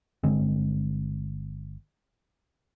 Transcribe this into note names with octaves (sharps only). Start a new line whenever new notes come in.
G1 D3 G#3 C4